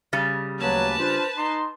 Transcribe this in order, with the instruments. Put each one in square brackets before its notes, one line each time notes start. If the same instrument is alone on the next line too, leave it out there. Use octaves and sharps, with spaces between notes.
[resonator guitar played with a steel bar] C#3 G3
[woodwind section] D2 E3 A#3 [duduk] F#3 [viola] B4 A5
[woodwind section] D4 F4 [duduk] C5
[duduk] D#4 [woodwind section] C6